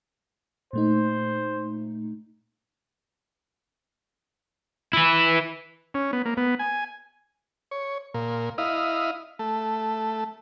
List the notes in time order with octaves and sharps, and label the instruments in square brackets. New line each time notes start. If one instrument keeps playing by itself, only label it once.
[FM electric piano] A#2 A3 D#4 [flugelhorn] C5
[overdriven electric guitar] E4 B4
[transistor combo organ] C#4
B3
A#3
B3
G#5
C#5
A#2
E4 D#5 F5
A3